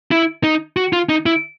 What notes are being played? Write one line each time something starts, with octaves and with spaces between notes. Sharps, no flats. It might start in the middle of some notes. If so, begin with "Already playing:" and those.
E4
D#4
F#4
F4
D#4
E4